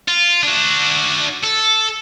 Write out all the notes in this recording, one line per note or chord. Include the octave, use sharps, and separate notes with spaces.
F4
D4 F#4
A4